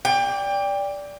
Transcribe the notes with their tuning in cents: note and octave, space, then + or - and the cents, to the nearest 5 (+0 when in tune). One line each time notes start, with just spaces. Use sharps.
D5 -15 G5 +25